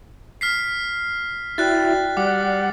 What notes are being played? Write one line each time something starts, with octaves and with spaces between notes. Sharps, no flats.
F6 B6 C7
E4 F#4 D5 G5 F#6 A6
G3 D5 F#5 D6